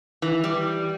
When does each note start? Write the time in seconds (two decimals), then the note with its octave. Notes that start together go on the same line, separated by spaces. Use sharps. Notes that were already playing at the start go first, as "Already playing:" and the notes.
0.22 E3
0.44 G3